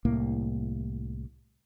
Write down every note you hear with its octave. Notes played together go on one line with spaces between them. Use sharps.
C2 A2 A#3